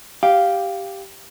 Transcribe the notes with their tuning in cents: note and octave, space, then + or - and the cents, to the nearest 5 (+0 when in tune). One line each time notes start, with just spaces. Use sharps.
G4 +0 F5 +0